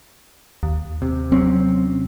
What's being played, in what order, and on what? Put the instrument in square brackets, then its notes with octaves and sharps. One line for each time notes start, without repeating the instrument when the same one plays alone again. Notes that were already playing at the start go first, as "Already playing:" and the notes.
[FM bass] D#2
[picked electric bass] C3
[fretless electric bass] F#3 C4 C#4